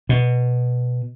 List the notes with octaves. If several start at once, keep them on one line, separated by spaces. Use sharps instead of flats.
B2